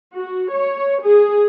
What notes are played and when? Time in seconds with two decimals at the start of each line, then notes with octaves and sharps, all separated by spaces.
0.16 F#4
0.52 C#5
1.03 G#4